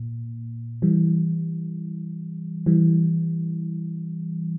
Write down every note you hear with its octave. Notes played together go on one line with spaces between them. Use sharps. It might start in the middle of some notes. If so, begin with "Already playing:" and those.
Already playing: A#2
E3 G3
E3 G3